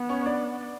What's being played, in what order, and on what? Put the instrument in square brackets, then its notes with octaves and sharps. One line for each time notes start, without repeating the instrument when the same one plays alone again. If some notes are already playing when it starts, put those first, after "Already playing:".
Already playing: [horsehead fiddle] B3
[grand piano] C#4 C#5
C#5
D4 D5